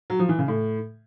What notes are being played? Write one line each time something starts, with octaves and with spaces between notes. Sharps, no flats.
F#3
F3
E3
C#3
A2